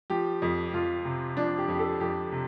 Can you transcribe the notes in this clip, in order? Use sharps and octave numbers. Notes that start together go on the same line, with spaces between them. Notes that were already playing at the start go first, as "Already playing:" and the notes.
F3 G4
F2
F2 F4
C3
F3 D4
G4
F2
G4
A4
F2 G4
C3